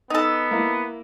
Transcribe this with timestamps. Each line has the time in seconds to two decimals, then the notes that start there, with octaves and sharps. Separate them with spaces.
0.10 B3 D#4 A4
0.51 A#3 E4